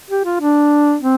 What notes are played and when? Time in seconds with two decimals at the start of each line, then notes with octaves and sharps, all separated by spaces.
0.10 G4
0.25 F4
0.41 D4
1.01 C4